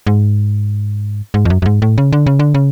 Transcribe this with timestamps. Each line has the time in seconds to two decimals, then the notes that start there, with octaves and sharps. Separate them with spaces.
0.07 G#2
1.34 G#2
1.45 F2
1.50 F#2
1.62 F#2
1.66 G#2
1.82 A2
1.98 C#3
2.13 D3
2.26 C#3
2.39 D3
2.54 C#3